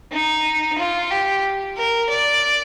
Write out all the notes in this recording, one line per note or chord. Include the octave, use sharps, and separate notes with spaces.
D#4
F4
G4
A#4
D5